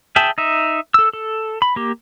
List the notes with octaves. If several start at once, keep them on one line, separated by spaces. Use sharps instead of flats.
G#4 E5 G5 A5
D#4 E5
A4 E6
A4
B5
A#3 G4